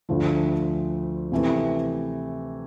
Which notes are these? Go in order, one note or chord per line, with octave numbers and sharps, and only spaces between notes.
D2 D3 F3 A3
C3 E3 A3